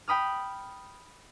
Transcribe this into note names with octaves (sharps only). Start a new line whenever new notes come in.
G5 B5 D#6 F6